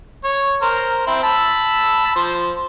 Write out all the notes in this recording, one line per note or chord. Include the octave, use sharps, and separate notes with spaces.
C#5
A#4 C5
C4 E4
A5 B5 E6
F3 C5